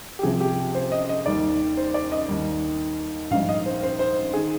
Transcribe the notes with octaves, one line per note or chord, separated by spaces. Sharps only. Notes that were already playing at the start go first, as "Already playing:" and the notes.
G4
C2 C3 F3 G#4
G4
C5
D#5
D#5
D#2 D#3 G3 D5
C5
D5
D#5
D#2 D#3 G3
A#1 G#2 G3 F5
D#5
C5
C5
C5
D#3 G#4